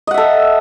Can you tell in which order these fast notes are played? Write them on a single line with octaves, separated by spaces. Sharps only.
D#5 F#5 E5 A4